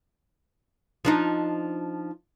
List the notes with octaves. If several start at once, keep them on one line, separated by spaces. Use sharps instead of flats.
F3 D4 D#4